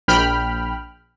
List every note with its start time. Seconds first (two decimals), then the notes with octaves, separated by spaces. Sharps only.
0.08 A#1 G5 B5 F6